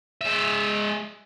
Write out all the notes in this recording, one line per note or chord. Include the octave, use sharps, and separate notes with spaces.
G#3 E5